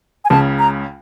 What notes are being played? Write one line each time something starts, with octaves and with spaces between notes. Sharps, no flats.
G#5
C#2 C#3 A5
A#5